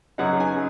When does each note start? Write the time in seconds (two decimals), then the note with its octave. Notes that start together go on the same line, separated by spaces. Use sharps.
0.18 F#2 C#3 F#3 B3 D#4 F#5
0.40 G#5